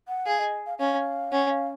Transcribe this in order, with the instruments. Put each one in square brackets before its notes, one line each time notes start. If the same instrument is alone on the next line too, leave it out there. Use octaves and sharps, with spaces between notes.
[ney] F#5
[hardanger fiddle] G#4 [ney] F5
[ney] D#5
F5
[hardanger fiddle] C#4 [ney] F5
[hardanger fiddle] C#4 [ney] F#5
[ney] F5